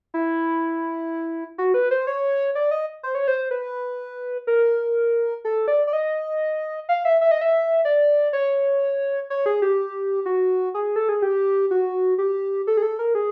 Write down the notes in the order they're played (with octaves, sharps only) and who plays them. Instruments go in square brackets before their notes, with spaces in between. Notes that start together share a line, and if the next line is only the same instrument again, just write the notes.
[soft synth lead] E4
F#4
B4
C5
C#5
D5
D#5
C5
C#5
C5
B4
A#4
A4
D5
D5
D#5
F5
E5
E5
D#5
E5
D5
C#5
C#5
G#4
G4
F#4
G#4
A4
G#4
G4
F#4
G4
A4
G#4
A4
A#4
G#4